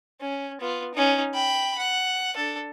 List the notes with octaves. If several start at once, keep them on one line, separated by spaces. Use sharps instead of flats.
C#4
B3 F4
C#4 D#4
G5 B5
F#5
D4 A4